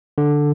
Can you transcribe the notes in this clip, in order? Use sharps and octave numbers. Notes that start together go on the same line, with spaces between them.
D3